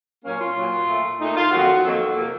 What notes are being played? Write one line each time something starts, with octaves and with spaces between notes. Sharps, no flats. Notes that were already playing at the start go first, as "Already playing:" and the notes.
A#2 F#3 A#3 C#4
F4
A#2 F#3 A#3
A#2 A3
A#2 A3 D#4
F4
F2 D#3 F#3 A#3 F#4
F2 D#3 F#3 A#3 A4
C3 F3 A#3